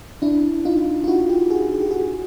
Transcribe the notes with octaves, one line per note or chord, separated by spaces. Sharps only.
D4 E4
D#4 F4
F4
E4 F#4
F4 G4
F#4 G#4
G#4
G4
F#4 G#4